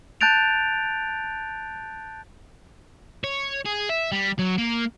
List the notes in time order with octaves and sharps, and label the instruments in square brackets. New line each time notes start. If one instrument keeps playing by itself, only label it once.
[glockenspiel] A5 F#6 G6 A6 D7 F7
[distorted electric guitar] C#5
G#4
E5
G3
F#3
A#3